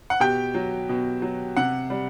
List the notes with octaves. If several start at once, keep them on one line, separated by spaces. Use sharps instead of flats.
F#5
B2 G4 G5
F#3
B2
F#3
C3 F#5
G3